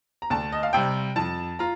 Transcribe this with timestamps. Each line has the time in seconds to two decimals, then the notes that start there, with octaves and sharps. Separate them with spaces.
0.22 A#5
0.30 D2 A5
0.52 D#5
0.63 F5
0.73 C3 G3 G5
1.16 F2 A5
1.59 F4 A#5